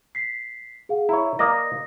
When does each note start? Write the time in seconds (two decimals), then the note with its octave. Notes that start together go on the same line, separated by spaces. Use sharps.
0.15 B6 C7
0.89 G#4 F5 F#5
1.09 E4 C#5 A#5
1.39 A#3 D5 D#5 D#6 A#6